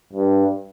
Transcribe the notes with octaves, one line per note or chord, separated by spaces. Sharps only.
G2